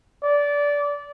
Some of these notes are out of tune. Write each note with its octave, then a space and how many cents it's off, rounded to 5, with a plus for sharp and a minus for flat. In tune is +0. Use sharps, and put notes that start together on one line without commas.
D5 -20